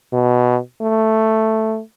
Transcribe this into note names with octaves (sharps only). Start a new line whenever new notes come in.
B2
A3